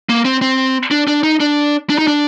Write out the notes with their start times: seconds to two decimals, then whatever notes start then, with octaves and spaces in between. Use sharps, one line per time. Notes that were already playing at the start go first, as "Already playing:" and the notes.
0.09 A#3
0.25 C4
0.41 C4
0.91 D4
1.08 D4
1.23 D#4
1.40 D4
1.90 D4
1.98 D#4
2.07 D4